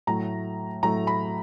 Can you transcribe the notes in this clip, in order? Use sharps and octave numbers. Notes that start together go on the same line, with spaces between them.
A2 F#3 A3 A#5
A2 F#3 A3 A#5
B5